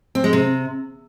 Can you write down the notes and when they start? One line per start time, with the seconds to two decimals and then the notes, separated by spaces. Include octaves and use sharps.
0.15 C4
0.24 G#3
0.33 C3